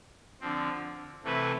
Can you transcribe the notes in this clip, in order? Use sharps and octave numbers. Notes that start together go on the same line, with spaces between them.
D3 F3 C4
C3 E3 A3 E4 B4